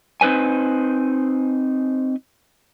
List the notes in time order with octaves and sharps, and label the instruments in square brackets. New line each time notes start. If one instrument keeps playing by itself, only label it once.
[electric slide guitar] C4 D#4 B4 C5 G#5